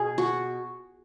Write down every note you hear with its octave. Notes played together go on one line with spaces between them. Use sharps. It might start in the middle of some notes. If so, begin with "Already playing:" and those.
Already playing: B2 G#4
F#4